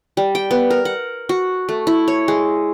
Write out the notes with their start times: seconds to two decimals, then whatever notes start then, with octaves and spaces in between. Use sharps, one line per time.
0.17 G3
0.35 G5
0.51 B3
0.70 A#4
0.85 F#5
1.29 F#4
1.69 A3
1.87 E4
2.08 C#5
2.28 G#3